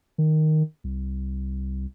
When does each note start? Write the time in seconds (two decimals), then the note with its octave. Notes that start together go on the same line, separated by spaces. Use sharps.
0.18 D#3
0.84 C2